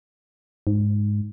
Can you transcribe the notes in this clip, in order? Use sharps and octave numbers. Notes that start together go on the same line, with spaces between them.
G#2